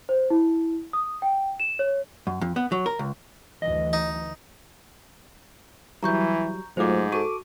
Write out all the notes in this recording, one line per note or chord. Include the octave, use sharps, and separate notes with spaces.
C5
E4
D#6
G5
E7
C#5
F#2
F2
B3
F#3
A#4
C#2
D2 E3 F#3 D#5
D#4
E3 F#3 G3 A#5 C#6 G6
G#2 F#3 A3 F4 C5 D6
F#4 A4 C#6 D6 D#7